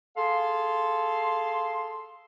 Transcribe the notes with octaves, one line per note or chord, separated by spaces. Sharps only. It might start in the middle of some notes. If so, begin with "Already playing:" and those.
G#4 A4 F5 C6